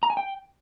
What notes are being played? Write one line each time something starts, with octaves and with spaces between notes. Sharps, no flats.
A#5
G#5
G5